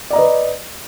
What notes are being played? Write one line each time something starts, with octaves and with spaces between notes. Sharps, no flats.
B4 D5 D#5 A#5